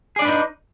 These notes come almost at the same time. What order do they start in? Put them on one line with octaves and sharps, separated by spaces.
G#4 D5 D4 B4 D#4